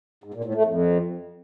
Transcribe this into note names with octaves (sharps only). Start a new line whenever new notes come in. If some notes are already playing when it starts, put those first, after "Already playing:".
G#2
A#2
A2
A3
F2